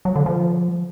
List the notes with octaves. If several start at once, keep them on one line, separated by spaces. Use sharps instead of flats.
F#3
D3
F3